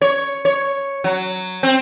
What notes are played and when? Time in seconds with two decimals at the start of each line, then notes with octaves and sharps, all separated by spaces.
0.01 C#5
0.45 C#5
1.04 F#3
1.63 C4